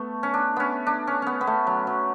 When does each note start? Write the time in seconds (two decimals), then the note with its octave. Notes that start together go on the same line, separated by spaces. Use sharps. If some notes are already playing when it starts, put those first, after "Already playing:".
Already playing: A3 B3
0.23 C#4
0.34 D4
0.56 B3 C#4
0.87 D4
1.07 C#4
1.22 B3 C#4
1.41 B3
1.47 A3
1.67 F#3
1.87 F#3